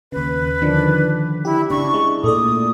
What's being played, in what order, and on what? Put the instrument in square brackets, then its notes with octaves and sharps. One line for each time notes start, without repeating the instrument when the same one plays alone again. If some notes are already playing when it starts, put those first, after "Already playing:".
[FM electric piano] D#2 C#3 [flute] B4
[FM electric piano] D3 D#3 F3 [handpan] D4
[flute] E4 [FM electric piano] G4
[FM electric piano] C#3 [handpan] D4 E4 [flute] C#6
[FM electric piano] G#3
[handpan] A#2 [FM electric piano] A3 A4 D5 [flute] D#6